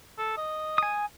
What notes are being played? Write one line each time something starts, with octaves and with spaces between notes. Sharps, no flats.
A4
D#5
G#5 D#6